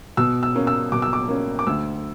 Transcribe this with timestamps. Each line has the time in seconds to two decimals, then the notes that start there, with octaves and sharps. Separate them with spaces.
0.17 B2 E6
0.43 E6
0.55 A#3 C#4
0.67 E6
0.92 B2 D6
1.02 E6
1.13 D6
1.28 A#3 C#4
1.59 D6
1.66 D2 E6